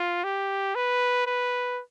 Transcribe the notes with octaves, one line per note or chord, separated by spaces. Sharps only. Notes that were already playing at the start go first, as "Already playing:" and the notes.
Already playing: F4
G4
B4
B4